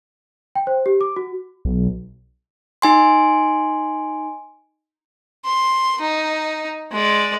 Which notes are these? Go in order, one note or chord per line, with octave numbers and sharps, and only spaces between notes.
G5
C5
G4
D6
F#4
B1
D#4 G#5 C6
C6
D#4
G#3 D5